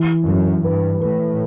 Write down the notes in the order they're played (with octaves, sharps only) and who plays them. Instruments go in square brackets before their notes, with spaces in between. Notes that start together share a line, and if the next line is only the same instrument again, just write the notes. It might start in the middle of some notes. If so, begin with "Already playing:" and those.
Already playing: [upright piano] E3
[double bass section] F#2 [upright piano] E3
[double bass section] G2 [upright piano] B4
[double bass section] A2 [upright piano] B4